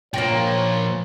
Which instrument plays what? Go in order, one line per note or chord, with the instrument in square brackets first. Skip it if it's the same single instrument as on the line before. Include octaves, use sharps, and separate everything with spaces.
[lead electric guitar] A#2 F3 [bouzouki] A#3 G5 [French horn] C#5